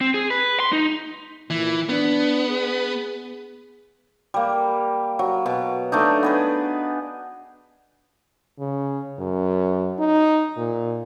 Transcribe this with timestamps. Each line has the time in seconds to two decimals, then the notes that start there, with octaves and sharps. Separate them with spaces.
0.01 C4
0.14 G#4
0.30 B4
0.60 C6
0.73 D#4
1.50 A#2 E3
1.89 B3 D4
2.48 G#4
4.34 G3 A#3
5.19 F#3
5.46 B2
5.92 A3 D4 D#4
6.23 B3 G#4 B4
8.59 C#3
9.19 F#2
9.99 D#4
10.57 A#2